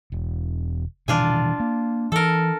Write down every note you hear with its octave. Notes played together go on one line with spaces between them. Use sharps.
E1
B2 D#3 E3 D4 F4 G#5
A#3
E3 A4 A#4